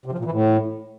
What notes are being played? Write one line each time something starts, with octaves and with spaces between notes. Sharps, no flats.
C3
F3
A#2
E3
A2